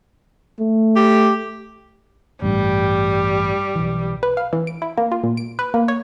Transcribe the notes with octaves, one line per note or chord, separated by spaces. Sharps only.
A3
G4
A1 G2 G3
B1 E3
B4
F5
E3
D7
E4
A#3
F4
A#2
D7
B4
A#3
C#5